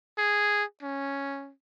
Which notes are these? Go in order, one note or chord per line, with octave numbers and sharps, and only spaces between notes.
G#4
C#4